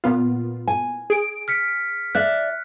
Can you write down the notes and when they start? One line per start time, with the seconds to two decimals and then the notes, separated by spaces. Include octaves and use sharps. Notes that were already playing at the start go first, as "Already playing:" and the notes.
0.04 A#2 B3 F4
0.67 G#5
1.10 G#4 D7
1.48 F6 B6 C#7
2.15 D5 E5 F#6